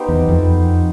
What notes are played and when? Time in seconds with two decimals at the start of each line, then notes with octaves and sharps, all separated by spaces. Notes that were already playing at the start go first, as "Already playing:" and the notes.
Already playing: B3 D#4 G4 C5
0.09 E2
0.29 F2